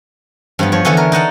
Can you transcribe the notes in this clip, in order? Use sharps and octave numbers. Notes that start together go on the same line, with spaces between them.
G2 F3 B3
F3 C#5
D3 E3 B3 A4 C#5
A#4
D#4 D#5 F#5 A5